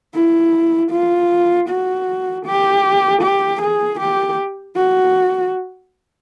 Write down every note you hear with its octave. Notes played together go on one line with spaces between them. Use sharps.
E4
F4
F#4
G4
G4
G#4
G4
F#4